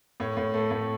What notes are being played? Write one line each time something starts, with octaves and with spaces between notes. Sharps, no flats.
A2 C#5
A2
A3
A2